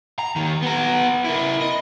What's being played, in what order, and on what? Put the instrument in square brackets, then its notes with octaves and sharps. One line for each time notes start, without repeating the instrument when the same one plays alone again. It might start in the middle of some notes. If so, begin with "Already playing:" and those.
[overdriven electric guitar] A#5
D#2 D#3
B3 A#5
E4 A#4
D#5